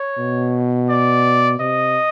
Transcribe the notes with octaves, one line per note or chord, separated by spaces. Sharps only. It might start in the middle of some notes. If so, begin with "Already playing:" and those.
Already playing: C#5
B2
D5
C3 D#5